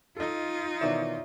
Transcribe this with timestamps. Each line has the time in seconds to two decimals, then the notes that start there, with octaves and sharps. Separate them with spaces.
0.17 D#4 F4 A4 D#5
0.81 B2 D#3 E3 C#5 D5 E5